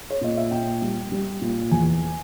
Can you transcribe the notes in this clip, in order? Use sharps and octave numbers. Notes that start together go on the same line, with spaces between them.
C#5
A#2 D#5
E5
A#2 G5
G3
G3
A#2
E2 G#5